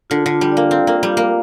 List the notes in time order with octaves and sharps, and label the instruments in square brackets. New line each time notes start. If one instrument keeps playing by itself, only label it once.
[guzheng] D3 [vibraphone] F4
[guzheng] D3 [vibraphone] F4
[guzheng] G3
[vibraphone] D5
[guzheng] A#3
[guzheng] C4 [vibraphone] F5
[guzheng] A#3 [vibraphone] F4
[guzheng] G3
[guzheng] A#3 [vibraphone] F4